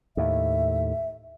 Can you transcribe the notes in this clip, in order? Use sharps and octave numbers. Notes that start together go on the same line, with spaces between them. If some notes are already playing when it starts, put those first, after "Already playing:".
D#2 A2 E5